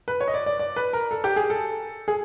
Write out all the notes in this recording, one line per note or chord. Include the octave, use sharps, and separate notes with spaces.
B4
C#5
D#5
D5
D5
D5
B4
A#4
A4
G4
G#4
A4
G#4